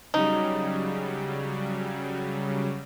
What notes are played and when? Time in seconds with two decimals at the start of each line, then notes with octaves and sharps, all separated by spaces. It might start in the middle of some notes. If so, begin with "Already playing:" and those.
0.14 C#3 F#3 G3 D#4